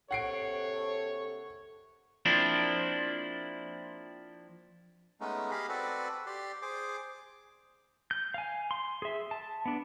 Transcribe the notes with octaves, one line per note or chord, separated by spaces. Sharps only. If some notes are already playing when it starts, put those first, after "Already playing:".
A#1 C3 A4 C#5 F#5 C7 D7
F3 A#3 C4 D4 E4
G#3 A3 B3 C#4 D#4
G4 G#4 D#5 F5 B5
C4 F#4 A4 B4 D5
G4 D5 C6
G#4 C5 D6
G6
F5 G#5
C6
G#4 E5
A5
B3 D4